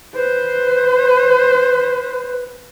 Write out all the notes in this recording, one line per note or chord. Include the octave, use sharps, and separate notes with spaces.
B4 C5